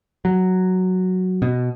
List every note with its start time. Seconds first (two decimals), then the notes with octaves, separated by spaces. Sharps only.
0.25 F#3
1.42 B2